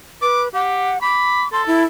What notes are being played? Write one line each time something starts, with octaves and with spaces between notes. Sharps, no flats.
B4 D6
G4 F#5
B5 D6
A4 C6
E4